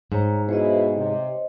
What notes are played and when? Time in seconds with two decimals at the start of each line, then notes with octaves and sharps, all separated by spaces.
0.12 G#2 C5 C#5 A#5
0.49 B2 E4 G#4 C5 C#5 D#5
0.96 C3 G4